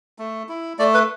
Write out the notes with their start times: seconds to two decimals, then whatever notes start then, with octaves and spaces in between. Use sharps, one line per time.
0.19 A3
0.49 E4
0.79 A3 D5
0.94 B4